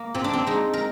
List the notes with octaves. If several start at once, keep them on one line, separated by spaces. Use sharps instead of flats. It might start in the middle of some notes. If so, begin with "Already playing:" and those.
Already playing: A#3
A#2 C4
D4
C4
G#3 D#4
A#4